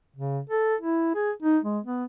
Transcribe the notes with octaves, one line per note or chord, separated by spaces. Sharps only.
C#3
A4
E4
G#4
D#4
G#3
B3